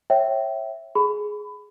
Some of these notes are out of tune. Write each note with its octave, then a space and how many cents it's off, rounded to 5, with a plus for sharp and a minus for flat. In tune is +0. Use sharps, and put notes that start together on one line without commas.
C#5 -25 E5 +0 G5 -15
G#4 +10 B5 +20